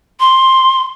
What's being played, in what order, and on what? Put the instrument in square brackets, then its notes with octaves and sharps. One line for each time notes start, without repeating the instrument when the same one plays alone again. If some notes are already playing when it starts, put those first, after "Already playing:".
[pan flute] C6